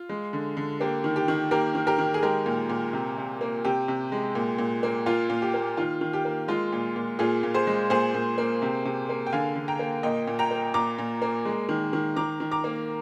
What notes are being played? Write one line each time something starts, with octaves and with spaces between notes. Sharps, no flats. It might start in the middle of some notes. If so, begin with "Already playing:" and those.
Already playing: F4
G#3
D3
D3
A#3 G4
D#3
G4
D#3
A#3 G4 A#4
D#3
G4 A#4
D#3
G#4
G#3 G4 A#4
A#2
A#2
C3
C3
A#3
C3 G4
C3
G#3
A#2
A#2
A#3
A#2 F4
A#2
G4
A#3
D#3 F4
D#3
G4
A#3
G#3 F4
A#2
A#2
A#2 F4 G#4
A#2
G#4 C5
G#3
A#2 G#4 C5
A#2
A#3
C3
C3
A#3
G5
D3 F5 G#5
D3
G5 A#5
A#3
A#2 D#5 G5
A#2
G5 A#5
A#3
A#2 A#5 D6
A#2
A#3
G#3
D#3
D#3
D#3 A#5 D6
D#3
A#5 D6
A#3